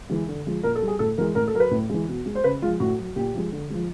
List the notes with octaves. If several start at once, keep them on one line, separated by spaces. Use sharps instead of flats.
E3 G#3
D3
F3 G#3
A#2 A#4
A4
G3
G#4
A2 A4
E3 G#3 A#4
A2 A#4
A4
F#3 A#4
B4
A2
E3 G#3
B2
G#3
C5
C#3 B4
F3 G#3 F4
A2 F#4
F#3
A#2 G4
F3 G#3
D3
F3 G#3